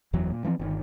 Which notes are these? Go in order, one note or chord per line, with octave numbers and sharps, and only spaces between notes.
F#1 E2 E3 F#3
A#2
E3 F3 A#3 C4
G1 D3 D#3